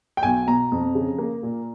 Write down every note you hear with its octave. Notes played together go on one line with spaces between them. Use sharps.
G5
B1 G#5
B2 A#5
F2
C#3
A#3
A#2